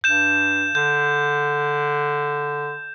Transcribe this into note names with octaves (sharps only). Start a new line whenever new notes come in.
G2 G6 E7
D3 G6